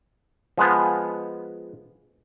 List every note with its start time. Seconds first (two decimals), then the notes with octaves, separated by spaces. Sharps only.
0.58 F3 G#3 B3